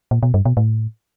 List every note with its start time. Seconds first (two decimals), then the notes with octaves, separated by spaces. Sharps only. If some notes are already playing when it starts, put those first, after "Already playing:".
0.11 A#2
0.23 B2
0.34 G2
0.45 B2
0.57 A2